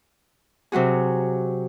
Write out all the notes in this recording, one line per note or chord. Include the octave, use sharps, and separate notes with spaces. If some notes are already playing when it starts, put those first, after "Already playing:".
C3 F#3 F#4 G#4